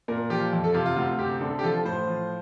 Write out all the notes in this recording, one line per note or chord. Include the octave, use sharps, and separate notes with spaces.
A#2 A#4
F3 G4
F2
A4
C3 F4
F4
D2 F4
C3 G4
D3 A4
G4
F3 A4
A2 C5
F3